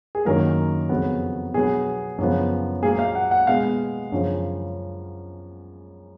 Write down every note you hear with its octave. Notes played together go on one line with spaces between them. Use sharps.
G#4
F#2 D#3 F#3 A#3 A#4
F2 C#3 F#3 B3
B2 F#3 B3 G#4
F#2 C#3 F3 B3
A#2 F#3 A#3 G#4
F5
F#5
F#5
B2 G#3 B3 F5
F#2 C#3 F3